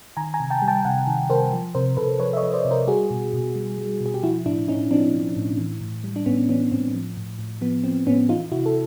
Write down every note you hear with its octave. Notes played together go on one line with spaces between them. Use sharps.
D#3 G#5 A#5
G#5 A#5
C3
G5 A5
G3
G5 A5
C3 F#5 G#5
D#3
C3 A#4 C5
F3
C3 A#4 C5
C3 A4 B4
F3 B4 C#5
E5
C#5 D#5
F3
C5 D5
C3
A#4 C5
G3 F#4 G#4
B2
B2
G3
G3
B2
G#4
G4
F3 E4 F#4
A2 D4 E4
A2 C#4 D#4
F3 C4 D4
F3
A2
E3
A2
G3
D4
A2 B3 C#4
E3 B3 C#4
A2 C4
F3
A2
A2
F3 B3
F3 C4
A2 B3 C#4
E3 D#4 F4
C3 E4 F#4
A4